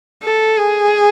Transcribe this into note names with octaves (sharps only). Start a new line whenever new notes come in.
A4
G#4